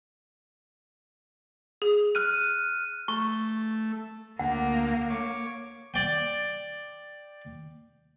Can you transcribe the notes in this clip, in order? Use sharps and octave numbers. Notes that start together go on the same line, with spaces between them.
G#4
F6 F#6 D#7
A3 C#6
D2 A#3 F#5
C#5 D6
D5 G5